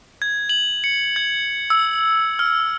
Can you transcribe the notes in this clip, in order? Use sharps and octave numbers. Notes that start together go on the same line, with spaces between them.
G#6
F#7
C#7
G#6
E6
F6